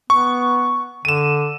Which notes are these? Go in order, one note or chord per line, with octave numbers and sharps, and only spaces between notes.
B3 C#6
D3 D#7 E7